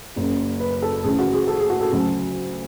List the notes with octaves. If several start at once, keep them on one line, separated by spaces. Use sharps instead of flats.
F#1 F#2 C#3
B4
A4
D2 C#3 E3 G#4
F#4
G#4
A4
G#4
F#4
A4
D2 C#3 F#3